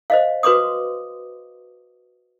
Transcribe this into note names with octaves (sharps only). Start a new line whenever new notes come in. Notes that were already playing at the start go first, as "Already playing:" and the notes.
C5 D#5 F5
F#4 B4 C6 D6 D#6